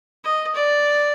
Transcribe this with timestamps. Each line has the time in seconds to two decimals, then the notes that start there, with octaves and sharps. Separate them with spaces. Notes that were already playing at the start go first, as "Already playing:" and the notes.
0.24 D#5
0.55 D5